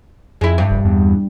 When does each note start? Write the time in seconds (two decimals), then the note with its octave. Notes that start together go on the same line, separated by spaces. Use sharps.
0.41 F2 G#3 E4
0.58 G2
0.70 F1
0.85 E2